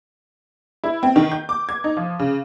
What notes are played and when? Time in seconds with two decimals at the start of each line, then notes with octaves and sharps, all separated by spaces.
0.84 E4
1.03 C4
1.16 D#3
1.32 G6
1.49 D6
1.69 G#6
1.84 D#4
1.97 F3
2.19 C#3